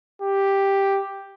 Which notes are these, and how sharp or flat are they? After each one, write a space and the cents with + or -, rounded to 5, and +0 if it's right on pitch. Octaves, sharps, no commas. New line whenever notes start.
G4 +5